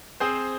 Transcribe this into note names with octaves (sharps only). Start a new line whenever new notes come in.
C4 G#4 C5